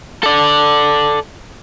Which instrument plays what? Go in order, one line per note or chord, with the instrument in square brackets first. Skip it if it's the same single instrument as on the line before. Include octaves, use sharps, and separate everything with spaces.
[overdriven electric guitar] A4 D5